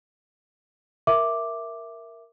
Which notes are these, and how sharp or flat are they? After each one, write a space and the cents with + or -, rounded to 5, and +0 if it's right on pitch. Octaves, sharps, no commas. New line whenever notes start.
A#4 +0 E5 +5 D6 +0